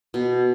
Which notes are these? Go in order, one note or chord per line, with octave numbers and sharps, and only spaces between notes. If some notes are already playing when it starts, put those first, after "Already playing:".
B2